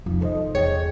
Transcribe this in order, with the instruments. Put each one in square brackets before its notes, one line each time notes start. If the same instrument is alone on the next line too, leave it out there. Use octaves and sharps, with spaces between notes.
[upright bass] F1 [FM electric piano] F2 [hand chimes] D#4 F4
[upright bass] C3 D#3 [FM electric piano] A4 C5 D#5
[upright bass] E2 [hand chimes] G#4 G5 [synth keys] C#5